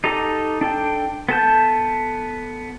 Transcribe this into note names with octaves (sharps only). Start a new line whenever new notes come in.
D#4 G4 A4 A#5
D4 A4 G5
B3 A4 A5 G6